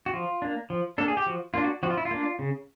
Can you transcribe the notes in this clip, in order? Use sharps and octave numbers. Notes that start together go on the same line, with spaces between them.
F#4
F3 F4
A#3 D4
F3
A#3 D4 A4
G#4
G4
F3 F#4
A#3 D4 F4
F#4
F3 F#4
F4
E4
F4
A#3 D4
C#3